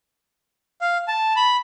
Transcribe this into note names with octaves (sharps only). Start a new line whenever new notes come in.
F5
A5
B5